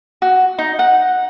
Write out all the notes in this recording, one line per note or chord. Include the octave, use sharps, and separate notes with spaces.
F#4
D#4
F#5